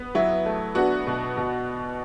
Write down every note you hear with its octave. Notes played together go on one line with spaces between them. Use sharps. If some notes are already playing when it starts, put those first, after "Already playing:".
Already playing: B3
F#3 E4
A3
B3 D4 F#4
B2
B2